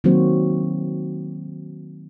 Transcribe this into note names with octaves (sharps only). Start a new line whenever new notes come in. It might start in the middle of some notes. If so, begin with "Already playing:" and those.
D#3 F#3 A#3 C4 F#4 C5